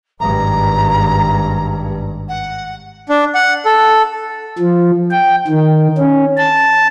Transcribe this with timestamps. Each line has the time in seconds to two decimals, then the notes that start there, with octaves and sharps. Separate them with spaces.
0.20 G#1 G2 A#5
2.29 F#5
3.09 D4
3.35 F#5
3.65 A4
4.59 F3
5.11 G5
5.47 D#3
5.98 C#4
6.38 A5